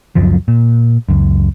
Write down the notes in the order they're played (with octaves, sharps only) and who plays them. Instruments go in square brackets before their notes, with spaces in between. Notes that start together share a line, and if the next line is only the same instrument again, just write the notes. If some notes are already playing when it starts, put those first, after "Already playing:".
[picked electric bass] C#2 F#2 F3 F#3
A#2
C#2 F#2